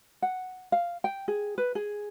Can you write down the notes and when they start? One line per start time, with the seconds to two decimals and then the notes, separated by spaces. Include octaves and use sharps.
0.22 F#5
0.72 F5
1.04 G5
1.28 G#4
1.58 B4
1.75 G#4